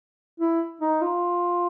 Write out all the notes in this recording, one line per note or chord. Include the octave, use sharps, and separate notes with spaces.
E4
D#4
F4